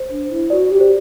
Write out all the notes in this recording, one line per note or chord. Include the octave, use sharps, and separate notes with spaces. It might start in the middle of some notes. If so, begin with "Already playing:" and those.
Already playing: C5
D4
E4
F#4 D5
G4
C5